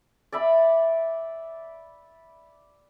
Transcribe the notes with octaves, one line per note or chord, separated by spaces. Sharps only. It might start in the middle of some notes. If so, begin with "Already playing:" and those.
D5 E5 B5